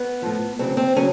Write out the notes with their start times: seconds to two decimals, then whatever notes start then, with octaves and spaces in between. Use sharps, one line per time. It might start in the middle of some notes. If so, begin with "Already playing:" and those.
Already playing: B3
0.22 A2 F3
0.59 D2 C#3 F#3 C4
0.77 C4
0.96 C#3 F#3 C#4